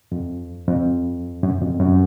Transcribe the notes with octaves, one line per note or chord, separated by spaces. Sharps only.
F2
F2
F#2
F2
F#2